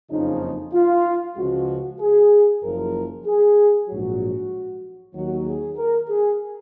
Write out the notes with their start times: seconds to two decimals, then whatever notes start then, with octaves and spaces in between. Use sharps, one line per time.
0.10 F#1 F2 C#3 F3 D#4
0.74 F4
1.37 C#2 C#3 F3 G#3 F#4
2.00 G#4
2.63 F#1 F#2 F3 A#4
3.26 G#4
3.89 A#1 G#2 F#3 F#4
5.15 D#2 D#3 F#3 F#4
5.47 G#4
5.77 A#4
6.09 G#4